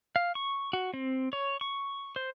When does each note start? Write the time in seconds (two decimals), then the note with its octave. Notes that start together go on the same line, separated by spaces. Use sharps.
0.16 F5
0.35 C#6
0.73 F#4
0.94 C4
1.33 C#5
1.61 C#6
2.16 C5